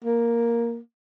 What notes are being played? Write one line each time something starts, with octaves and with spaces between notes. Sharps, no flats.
A#3